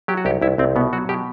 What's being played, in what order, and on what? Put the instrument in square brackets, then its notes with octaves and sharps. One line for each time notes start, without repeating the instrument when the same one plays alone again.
[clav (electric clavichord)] F#3 G4
F#4
C2 G4
C2 E4
C2 C4
B2 B3
F#3 F#4
B2 G4